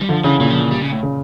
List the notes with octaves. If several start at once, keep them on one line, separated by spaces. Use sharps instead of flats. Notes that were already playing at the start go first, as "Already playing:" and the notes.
G3
D3 F3
C#3 E3
A#2 E3
F3
E3
G3
C#3
A2
C#3